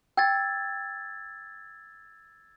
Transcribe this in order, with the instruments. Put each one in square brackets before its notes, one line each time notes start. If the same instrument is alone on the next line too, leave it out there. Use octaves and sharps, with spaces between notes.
[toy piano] G5 [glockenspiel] E6 G#6 A6